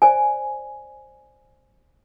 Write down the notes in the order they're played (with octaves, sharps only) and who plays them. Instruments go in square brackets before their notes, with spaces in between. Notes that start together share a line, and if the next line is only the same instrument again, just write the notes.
[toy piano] C5 D5 G#5